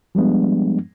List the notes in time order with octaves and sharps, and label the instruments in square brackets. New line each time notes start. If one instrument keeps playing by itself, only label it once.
[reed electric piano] F3 G3 G#3 B3 D4